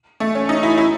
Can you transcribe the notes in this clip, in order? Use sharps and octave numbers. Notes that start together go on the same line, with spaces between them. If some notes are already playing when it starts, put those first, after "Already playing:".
A3
C#4
D#4
E4
E4